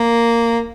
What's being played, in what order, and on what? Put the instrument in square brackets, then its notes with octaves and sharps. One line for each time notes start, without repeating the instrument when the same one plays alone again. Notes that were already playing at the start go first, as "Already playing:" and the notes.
Already playing: [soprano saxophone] A#3